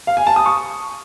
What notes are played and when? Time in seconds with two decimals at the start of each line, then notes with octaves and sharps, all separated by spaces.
0.07 F5
0.17 G#5
0.27 A5
0.36 D#6
0.46 C#6